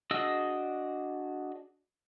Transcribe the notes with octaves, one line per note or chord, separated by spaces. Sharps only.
D4 F#4 G#4 D#5 E6